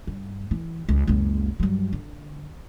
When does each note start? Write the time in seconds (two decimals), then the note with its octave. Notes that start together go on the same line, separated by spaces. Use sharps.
0.07 G2
0.51 E3
0.89 C#2
1.07 F#1 C#2
1.60 G2 F#3
1.93 D3